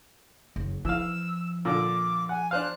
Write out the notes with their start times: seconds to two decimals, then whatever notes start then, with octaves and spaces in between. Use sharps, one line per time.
0.56 F#1
0.85 E3 F3 F5 E6
1.65 A#2 D3 D6
2.29 F#5 G#5
2.51 D4 C5 F5 F#6